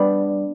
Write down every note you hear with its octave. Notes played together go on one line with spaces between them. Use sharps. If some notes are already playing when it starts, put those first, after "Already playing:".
Already playing: G3 B3 D4